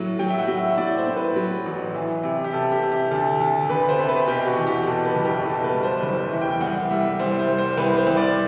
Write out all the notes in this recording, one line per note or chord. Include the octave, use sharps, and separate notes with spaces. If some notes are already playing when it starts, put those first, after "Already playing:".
Already playing: A2 F#3
F#3 G5
E5
F#5
F#3
E5
A2 D5
C5
A2
B4
F#3
A1
E3
C3
G4
C3 A4
G4
C3
G4
D2 A4
D2
D2 B4
C5
C3
B4
B2 G4
F#4
E2
G4
B2 A4
B4
F#1
G4
B2 A4
B4
G3
C5
F#1 C5
E5
E2
G5
C2 F#5
G3 E5
C2 C5
C5
G3
C5
C2 B4
C5
C2
D5